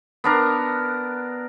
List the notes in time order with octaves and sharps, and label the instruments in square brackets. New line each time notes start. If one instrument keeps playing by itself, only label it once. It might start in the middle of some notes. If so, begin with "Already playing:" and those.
[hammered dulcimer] B3 D4 A#4